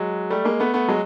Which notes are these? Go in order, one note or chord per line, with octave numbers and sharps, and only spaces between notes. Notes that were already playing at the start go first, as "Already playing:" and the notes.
Already playing: F#3 G#3
G3 A3
G#3 A#3
A3 B3
A3 B3
F#3 G#3